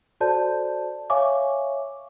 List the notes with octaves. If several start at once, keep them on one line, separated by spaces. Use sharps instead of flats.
F#4 A4 C5 D5 A5 G6
C#5 E5 F5 G#5 C#6 D6